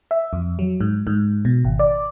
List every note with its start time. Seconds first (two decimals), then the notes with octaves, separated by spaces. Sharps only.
0.11 E5
0.33 F2
0.59 F#3
0.80 G#2
1.07 G#2
1.45 B2
1.65 G#1
1.79 D5